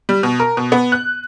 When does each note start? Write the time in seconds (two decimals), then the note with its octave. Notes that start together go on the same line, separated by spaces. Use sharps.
0.09 G3
0.23 B2
0.40 A#4
0.57 B2
0.72 B3
0.92 F#6